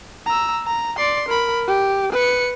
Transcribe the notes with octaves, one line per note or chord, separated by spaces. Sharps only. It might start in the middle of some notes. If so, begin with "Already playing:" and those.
A#5 E6
A#5
D5 C6
A#4 B5
G4
B4 C#7